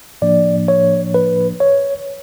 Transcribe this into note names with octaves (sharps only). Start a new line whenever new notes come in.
A2 F3 A#3 D4 D5
C#5
B4
C#5